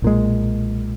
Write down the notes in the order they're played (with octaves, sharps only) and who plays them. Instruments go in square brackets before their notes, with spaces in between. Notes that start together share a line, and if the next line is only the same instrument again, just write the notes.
[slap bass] B1 A#2 G#3